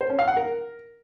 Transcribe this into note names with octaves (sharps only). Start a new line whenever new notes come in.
C5
C#4
F5
F#5
A#4